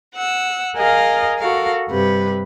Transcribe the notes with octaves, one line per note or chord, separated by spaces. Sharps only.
F#5 E6
G#4 A#4 D#5 F5
F#4 A4 A#4 F5
G2 C3 B4